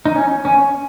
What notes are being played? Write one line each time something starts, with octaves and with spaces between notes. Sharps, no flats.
D#4
C#4
C#4